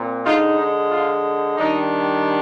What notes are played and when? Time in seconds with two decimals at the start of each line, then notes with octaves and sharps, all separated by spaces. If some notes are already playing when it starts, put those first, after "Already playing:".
Already playing: A#2 C4
0.25 D3 G#3 D#4 F4
0.58 D#4
0.91 F4
1.57 D#3 G3 D4 D#4